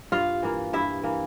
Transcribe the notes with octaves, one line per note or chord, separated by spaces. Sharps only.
G2 F4 F5
E3 A#3
G2 E4 E5
E3 A#3